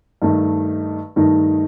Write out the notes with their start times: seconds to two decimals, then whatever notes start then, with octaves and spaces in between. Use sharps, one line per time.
0.22 G2 D#3 A3 D#4
1.16 G2 D#3 A3 D#4